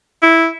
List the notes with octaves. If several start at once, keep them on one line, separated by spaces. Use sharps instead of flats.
E4